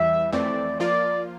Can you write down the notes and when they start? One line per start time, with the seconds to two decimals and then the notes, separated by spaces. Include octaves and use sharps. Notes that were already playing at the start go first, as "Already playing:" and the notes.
Already playing: E2 E3 G3 E5
0.32 F2 E3 A3 C4 D5
0.80 F3 A#3 F4 D5